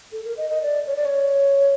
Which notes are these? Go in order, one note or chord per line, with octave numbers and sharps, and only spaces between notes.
A4
A#4
D#5
D#5
D5
C#5
D5
C#5